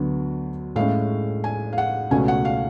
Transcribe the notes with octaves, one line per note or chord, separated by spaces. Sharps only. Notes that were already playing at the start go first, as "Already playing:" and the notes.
Already playing: D2 D3 F#3 B3
A2 G#3 C#4 F5
G#5
F5
F#5
C#2 B2 A3 C#4 G#5
F#5
F5